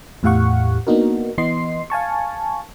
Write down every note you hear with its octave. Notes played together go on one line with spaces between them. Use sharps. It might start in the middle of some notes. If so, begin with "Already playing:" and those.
E2 A2 G4 F5 F#5 C#6
A#3 B3 D4 D#4 F#4 A#4
E3 B3 D#5 C6 C7
F5 G#5 A5 C#6